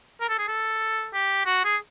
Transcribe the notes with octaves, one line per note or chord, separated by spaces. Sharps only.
A#4
A4
G#4
A4
G4
F#4
G#4